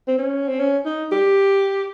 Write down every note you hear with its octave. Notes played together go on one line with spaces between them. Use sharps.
C4
C#4
C4
C#4
D#4
G4